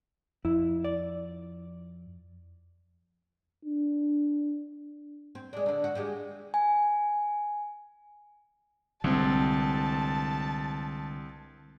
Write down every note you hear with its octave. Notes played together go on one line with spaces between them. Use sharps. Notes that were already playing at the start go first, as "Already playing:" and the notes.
F2 E4
D5
D4
C4
G#3 D4
D3 D4
F#4
G#3 F4 G4
G#5
C2 D3 G#3 C4 A5